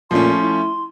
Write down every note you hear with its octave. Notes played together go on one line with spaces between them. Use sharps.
A#2 F3 A3 C#4 C6
E4